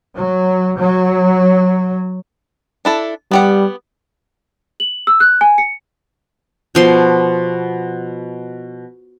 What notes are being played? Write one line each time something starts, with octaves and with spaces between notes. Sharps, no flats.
F#3
F#3
D4 E4 A4
G3 B3 G4 F#5
F#7
E6
F#6
G#5
C#7
B2 F3 C6